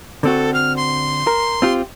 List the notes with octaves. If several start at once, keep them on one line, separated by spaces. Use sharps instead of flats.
D3 C4 F#4 A4
F6
C6
A#4
C4 F4 G4